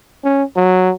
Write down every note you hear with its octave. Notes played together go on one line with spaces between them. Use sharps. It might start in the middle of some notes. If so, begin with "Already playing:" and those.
C#4
F#3